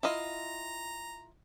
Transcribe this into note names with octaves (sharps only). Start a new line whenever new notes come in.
E4 F4 D#5 A#5